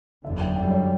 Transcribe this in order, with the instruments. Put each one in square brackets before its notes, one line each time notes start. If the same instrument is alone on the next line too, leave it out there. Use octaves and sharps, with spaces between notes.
[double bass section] F#1 E2 D3 [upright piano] E5
[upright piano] G5
[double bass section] F#2 D3 G3 [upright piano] G5
[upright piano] C#5